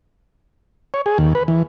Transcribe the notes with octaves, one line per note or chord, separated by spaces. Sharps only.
C#5
G#4
D#2
B4
E3